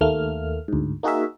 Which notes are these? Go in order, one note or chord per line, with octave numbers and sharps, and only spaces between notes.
D#2 A3 A#3 F6
D2 G#2
A#3 D#4 F#4 G#4 A#4 E5